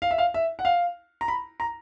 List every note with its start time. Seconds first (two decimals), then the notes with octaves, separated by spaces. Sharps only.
0.02 F5
0.11 E5
0.18 F5
0.34 E5
0.59 F#5
0.65 F5
1.21 A#5
1.28 B5
1.60 A#5